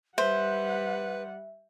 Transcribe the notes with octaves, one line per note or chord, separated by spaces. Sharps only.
G3 B4 C5 E5 F#5